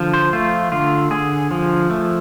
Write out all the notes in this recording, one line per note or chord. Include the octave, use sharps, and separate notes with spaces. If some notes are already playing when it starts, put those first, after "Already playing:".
Already playing: D3 F3
C5
A3 F4
D3 F4
D3 G#4
F3
A3